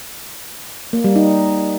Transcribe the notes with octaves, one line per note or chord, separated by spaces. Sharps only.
A#3
G3
D#4